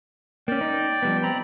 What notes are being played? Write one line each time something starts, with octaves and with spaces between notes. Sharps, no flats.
A#3 C#4 D5 G5
D#4
F3 G3 B3
C4 A#5 B5